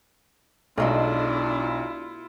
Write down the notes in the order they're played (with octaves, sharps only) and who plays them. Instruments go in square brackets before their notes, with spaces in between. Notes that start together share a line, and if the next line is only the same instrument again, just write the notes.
[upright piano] B1 [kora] B2 G#3 A3 [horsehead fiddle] D4 [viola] E4 F4